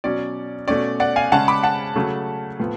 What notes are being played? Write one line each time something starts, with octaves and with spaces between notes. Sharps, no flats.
B2 F#3 C#4 D5
B2 A3 C#4 D5
D5 F#5
F5 G#5
C#3 G#3 C#4 F#5 A5
B5 D6
F#5 A5
C#3 F#3 A3 C#4
A2 F3 B3